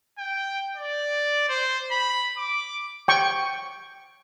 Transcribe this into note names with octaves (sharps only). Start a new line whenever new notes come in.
G5
D5
C5
B5
D6
G5 C#6